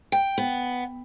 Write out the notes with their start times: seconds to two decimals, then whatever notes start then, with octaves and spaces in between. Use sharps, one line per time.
0.12 G5
0.38 B3